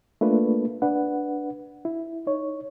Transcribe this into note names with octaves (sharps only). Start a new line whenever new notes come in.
A3 A#3 D4 F4 B4
D4 B4 F#5
E4
D#4 C#5